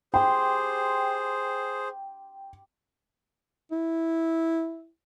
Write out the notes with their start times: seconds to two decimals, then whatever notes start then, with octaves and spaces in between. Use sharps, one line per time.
0.14 G4 G#4 C5 G5 B5 C6
3.72 E4